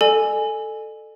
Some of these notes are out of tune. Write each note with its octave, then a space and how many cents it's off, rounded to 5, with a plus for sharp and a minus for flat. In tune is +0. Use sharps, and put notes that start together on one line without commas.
A4 +0 D5 +45 G#5 +0